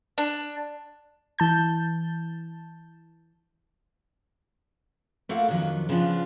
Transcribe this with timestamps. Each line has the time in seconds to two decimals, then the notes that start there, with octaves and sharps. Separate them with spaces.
0.18 D4
1.39 E3 A5 G6
5.29 A3 A#3 F4 A4 F5 F#5
5.48 F2 D#3 F3 F#3 D4
5.89 C#3 F3 B3 C4 D4 F4